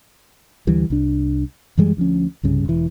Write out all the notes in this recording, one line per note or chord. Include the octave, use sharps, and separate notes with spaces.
D2 E3 G3
C2 D4
F#2 E3 G3 G#3
D2 F3 C#4
C2 G2 C#3
E1 E3